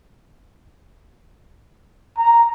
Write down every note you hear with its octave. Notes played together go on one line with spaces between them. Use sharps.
A#5